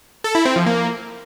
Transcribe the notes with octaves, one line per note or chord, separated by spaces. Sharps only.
A4
E4
C4
F3
A#3